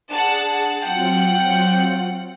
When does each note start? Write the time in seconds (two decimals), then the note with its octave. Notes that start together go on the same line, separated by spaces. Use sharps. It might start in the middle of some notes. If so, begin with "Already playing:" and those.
0.10 D4 G#4 F#5 A5
0.83 F#3 C4 F4 F#5 G5